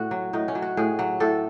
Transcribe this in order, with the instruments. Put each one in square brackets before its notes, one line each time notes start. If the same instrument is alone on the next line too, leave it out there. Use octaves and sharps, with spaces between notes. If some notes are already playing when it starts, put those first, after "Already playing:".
Already playing: [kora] A2 F#4
F#3
A2 D#4
C#4
F#3
F#4
A2 G#4
F#3
A2 A4